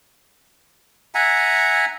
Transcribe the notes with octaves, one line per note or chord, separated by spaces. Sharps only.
E5 F#5 G#5 A#5